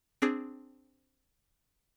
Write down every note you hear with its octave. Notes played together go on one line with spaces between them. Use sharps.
C4 D4 G#4